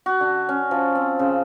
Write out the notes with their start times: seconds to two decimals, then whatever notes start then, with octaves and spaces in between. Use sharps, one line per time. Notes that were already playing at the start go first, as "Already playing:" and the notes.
0.06 F#4
0.21 D3
0.49 C#4
0.71 F3
0.95 C4
1.19 C#3